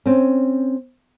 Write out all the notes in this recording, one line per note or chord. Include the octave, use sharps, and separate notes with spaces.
C4 C#4